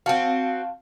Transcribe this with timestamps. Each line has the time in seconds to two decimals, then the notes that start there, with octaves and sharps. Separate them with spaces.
0.06 C4 F#4 F5 A5